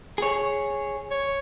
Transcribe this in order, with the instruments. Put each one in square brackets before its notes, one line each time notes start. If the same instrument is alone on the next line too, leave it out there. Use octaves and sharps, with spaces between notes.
[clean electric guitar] G#4 C#5
[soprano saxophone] C#5